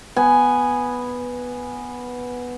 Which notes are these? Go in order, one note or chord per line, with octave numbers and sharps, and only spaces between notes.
B3 G#5